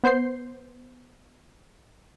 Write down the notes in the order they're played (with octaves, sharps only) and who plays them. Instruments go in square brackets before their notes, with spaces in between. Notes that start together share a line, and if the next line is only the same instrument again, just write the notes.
[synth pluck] B3 C5 G6 C7